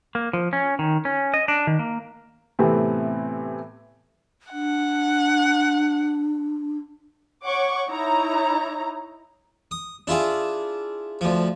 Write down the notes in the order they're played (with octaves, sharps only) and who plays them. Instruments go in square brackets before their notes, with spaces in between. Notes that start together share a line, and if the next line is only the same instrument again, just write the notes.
[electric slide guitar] A#3
F3
C#4
D#3
C#4
D#5
D4
D#3
A#3
[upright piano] A2 C3 E3 A3 B3 C4
[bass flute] D4 [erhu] F#5
[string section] C#5 F#5 C#6 D6
D#4 E4 C#5 A#5
[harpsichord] D#6
D4 E4 F4 G#4
D2 F3